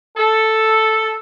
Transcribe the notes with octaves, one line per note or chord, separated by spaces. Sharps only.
A4